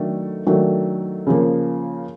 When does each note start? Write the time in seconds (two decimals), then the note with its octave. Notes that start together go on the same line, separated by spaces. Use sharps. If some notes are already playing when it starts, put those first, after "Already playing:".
Already playing: D#3 F#3 A3 D4
0.47 D#3 F#3 A3 D4
1.27 C#3 F3 A#3